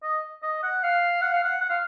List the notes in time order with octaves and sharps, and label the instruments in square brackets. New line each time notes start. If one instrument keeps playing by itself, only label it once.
[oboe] D#5
D#5
F#5
F5
F#5
F5
F#5
F#5
F5